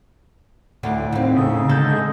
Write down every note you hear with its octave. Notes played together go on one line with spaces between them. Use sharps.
D2 A2 D6
D#2 C4
C#3 D#4 G#4 E5
D3 G#3 A4 G6